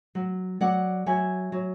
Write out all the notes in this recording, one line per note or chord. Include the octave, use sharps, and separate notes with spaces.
F#3
F#3 D5 F#5
F#3 E5 G#5
F#3